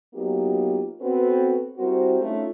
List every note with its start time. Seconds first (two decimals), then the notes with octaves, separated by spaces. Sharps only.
0.14 F#3 A#3 B3 D#4 F4 G4
1.01 B3 C4 F#4 A4 B4
1.77 G3 C4 E4 F#4 A#4 C5
2.20 A3 C#4 D#4 F4